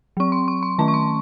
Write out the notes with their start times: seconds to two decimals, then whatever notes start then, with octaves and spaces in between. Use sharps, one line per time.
0.17 F#3 C4 C#6
0.32 C6
0.48 C#6
0.63 C6
0.78 D#3 A3 C#4 A5
0.88 C#6
0.94 C6